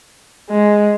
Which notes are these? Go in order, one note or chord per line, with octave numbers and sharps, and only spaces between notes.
G#3